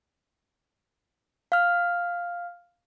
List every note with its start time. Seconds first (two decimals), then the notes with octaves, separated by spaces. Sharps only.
1.52 F5 F6